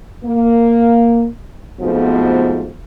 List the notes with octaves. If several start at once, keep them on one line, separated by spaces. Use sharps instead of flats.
A#3
F2 G#2 B2 F3 A3 B3